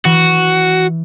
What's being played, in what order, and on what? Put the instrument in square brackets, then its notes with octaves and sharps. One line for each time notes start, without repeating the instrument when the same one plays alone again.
[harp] E3 [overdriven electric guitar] F#4